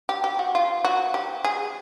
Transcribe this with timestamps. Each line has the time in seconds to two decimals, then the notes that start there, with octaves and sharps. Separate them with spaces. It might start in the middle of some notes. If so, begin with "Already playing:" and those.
0.09 G4
0.24 G4
0.39 F#4
0.55 F4
0.84 F#4
1.14 G4
1.44 G#4